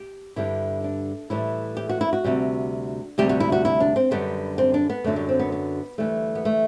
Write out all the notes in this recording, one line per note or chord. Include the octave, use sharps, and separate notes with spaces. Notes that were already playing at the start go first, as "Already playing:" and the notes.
Already playing: G4
G2 D3 G3 E4
D4
A2 E3 G3 E4
G4
F#4
E4
F#4
D2 C3 G3
D2 C3 G3 G4
F#4
E4
F#4
E4
D4
C4
F#2 D3 G3 B3
C4
D4
B3
F#2 D3 F#3 A3
G3
C4
B3
B3
D2 C3 E3 G3 A3
B3
A3